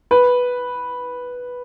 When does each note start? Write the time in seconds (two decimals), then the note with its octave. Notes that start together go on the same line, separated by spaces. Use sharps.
0.11 B4